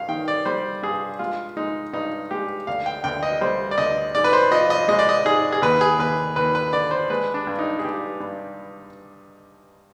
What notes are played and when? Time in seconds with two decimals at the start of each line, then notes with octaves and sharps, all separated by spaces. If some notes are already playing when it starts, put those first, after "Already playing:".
Already playing: G2 F5
0.08 D#3 G5
0.28 D5
0.45 G3 C5
0.83 G2 G#4
1.19 G#3 F4
1.57 G#3 D#4
1.93 G2 D#4
2.31 G#3 G4
2.67 D2 F5
2.86 G5
3.04 D2 G5
3.23 D#5
3.41 G3 C5
3.71 D5
3.78 D2 D#5
4.15 G#2 D5
4.24 B4
4.33 C5
4.52 F3 D#5
4.70 D#5
4.88 G#3 D#5
4.99 D5
5.09 D#5
5.25 G#2 G#4
5.52 G#4
5.62 D#2 B4
5.81 G#4
5.99 D#2 B4
6.36 D#2 B4
6.55 B4
6.73 D3 D5
6.91 C5
7.10 G#3 B4
7.34 D4
7.47 G2
7.59 D#4
7.79 G#4
7.84 G2 G4
8.20 G2